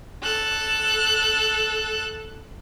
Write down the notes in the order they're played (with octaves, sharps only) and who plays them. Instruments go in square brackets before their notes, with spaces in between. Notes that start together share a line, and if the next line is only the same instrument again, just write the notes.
[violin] A4 F#6